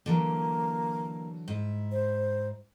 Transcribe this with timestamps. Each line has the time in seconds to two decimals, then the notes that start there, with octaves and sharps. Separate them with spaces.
0.06 D3 E3 F#3 A#3
1.48 G#2 E4
1.92 C5